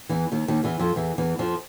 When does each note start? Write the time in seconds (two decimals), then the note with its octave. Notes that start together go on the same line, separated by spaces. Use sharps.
0.09 E2 E3
0.32 D#2 D#3
0.48 D#2 D#3
0.64 E2 E3
0.79 F2 F3
0.96 E2 E3
1.18 E2 E3
1.39 F2 F3